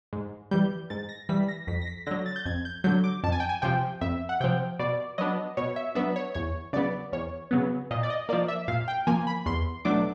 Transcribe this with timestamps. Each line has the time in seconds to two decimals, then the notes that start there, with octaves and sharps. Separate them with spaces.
0.13 G#2
0.51 E3 G3 G6
0.90 G#2 A6
1.09 A#6
1.29 E3 G3 B6
1.48 A#6
1.67 F2 B6
1.81 A#6
1.87 B6
2.06 D3 F#3 A#6
2.26 A6
2.36 G6
2.45 F2 G#6
2.65 G6
2.84 D3 F#3 G6
3.04 D6
3.23 F2 A5
3.32 G#5
3.40 G5
3.49 G#5
3.62 C3 F3 G5
4.01 F2 E5
4.29 F#5
4.40 C3 F3 G5
4.79 B2 D5
5.18 F#3 B3 D4 D#5
5.57 B2 C#5
5.76 E5
5.95 F#3 B3 D4 E5
6.16 C#5
6.34 E2 C#5
6.73 C#3 F#3 B3 D5
7.12 E2 C#5
7.51 C#3 F#3 B3
7.91 A#2 D#5
8.03 D5
8.10 D#5
8.29 F3 A#3 D5
8.48 E5
8.68 A#2 F5
8.88 G5
9.07 F3 A#3 G#5
9.27 B5
9.46 E2 C6
9.85 B2 F#3 A3 D4 D6